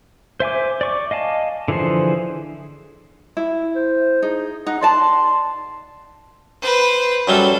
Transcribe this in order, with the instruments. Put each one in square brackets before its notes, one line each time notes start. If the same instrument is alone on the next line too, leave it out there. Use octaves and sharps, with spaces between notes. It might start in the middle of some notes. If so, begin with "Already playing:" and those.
[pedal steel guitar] C5 E5 G#5 D6
D5 C#6 D6
D#5 F5 G#5 A5
D3 E3 F3 G#4 C5
[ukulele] E4
[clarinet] C5
[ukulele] D#4 [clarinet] G#4
[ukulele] D#4 [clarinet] F#5
[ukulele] D#4 D5 A5 [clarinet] C6
[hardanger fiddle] B4 C5
[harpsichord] F#2 F#3 G3 [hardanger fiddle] A4